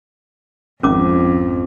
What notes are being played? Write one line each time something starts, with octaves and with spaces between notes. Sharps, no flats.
G#1 F2 C#4 D6